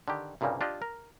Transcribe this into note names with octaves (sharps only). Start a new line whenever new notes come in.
D3 D#3 G4
C2 G2 A#2 C#3 G3 A#3
D4 F4 G4 D5 D#5
A#4